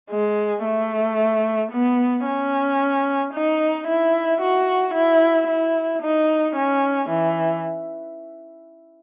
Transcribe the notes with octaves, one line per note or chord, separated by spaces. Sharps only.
G#3
A3
B3
C#4
D#4
E4
F#4
E4
E4
D#4
C#4
E3